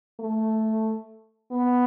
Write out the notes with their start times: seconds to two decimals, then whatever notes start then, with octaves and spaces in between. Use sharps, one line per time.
0.20 A3
1.52 B3